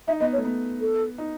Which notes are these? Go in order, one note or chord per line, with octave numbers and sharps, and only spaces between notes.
D#4 E5
B3 D#5
C#5
A3
B3
A4
D#4